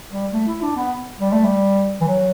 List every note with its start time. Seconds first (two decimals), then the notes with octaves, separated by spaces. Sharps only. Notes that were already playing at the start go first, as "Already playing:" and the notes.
0.12 G3
0.33 A3
0.47 E4
0.62 D4
0.76 B3
1.21 G3
1.32 A3
1.44 G3
2.01 E3
2.07 F#3